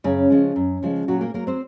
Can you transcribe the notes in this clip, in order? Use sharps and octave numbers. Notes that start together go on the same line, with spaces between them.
F#2 C#3 C#4
C#3 F3 G#3
F#2
C#3 F3 G#3
A#2 F#3 F#4
A#3 A#4
F#3 A#3 A#4
C4 C5